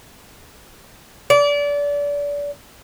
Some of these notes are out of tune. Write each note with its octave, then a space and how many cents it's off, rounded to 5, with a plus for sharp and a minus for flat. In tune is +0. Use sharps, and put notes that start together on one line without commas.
D5 -30